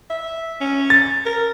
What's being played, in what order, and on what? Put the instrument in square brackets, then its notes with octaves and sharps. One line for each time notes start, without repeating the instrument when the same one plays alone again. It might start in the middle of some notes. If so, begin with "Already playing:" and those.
[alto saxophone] E5
C#4
[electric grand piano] A6
[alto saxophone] A#4